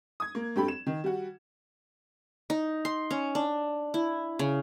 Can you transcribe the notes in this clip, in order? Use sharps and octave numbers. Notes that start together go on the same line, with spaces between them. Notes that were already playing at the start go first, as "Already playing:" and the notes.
D#6 G#6
A#3
G2 C4 G4 A4 B5
E7
D#3
G3 F#4
D#4
C6
C#4
D4
E4
C#3